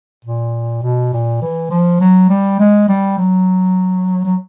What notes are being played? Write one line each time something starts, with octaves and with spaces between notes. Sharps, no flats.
A#2
B2
A#2
E3
F3
F#3
G3
G#3
G3
F#3
F#3